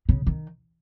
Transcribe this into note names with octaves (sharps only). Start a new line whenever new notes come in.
C#3
D#3